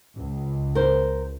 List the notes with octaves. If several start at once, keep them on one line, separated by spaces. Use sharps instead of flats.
C#2
A#4 C5